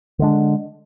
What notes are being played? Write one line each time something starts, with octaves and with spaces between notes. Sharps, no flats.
D3 G#3 D4